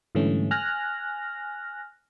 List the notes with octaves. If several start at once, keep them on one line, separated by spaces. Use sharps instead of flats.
G#2 D3 E3 G3 A3 C#4
G#5 F6 F#6 A#6